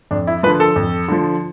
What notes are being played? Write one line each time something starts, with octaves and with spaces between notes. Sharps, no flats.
F2 D4
E4
D3 F3 B4
A4
F2
D3 F3